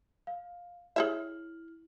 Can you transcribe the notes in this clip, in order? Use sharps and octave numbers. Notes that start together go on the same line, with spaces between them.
F5
E4 G#4 C#5 E5 F6 F#7